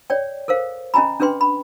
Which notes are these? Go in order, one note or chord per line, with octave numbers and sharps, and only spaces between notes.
C#5 D5 G5
A4 A#4 C5 F5
C#4 D#5 G#5 A#5 B5
C#4 D4 G#4 B4 G5 C6
B5